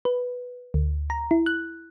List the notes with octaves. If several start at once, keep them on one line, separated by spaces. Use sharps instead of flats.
B4
D2
A#5
E4
F#6